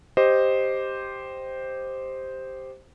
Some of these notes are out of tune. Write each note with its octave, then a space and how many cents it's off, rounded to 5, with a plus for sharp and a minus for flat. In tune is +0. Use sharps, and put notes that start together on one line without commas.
G4 +0 C5 +0 D#5 +0